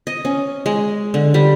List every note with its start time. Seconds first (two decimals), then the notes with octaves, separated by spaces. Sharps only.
0.07 D#5
0.25 C#4
0.66 G#3
1.14 D3
1.34 G3